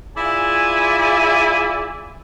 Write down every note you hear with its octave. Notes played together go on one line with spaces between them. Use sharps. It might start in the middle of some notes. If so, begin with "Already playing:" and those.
E4 F4 G#4 D5 E5 G#5